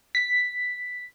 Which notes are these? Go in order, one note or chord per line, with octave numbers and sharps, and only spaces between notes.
B6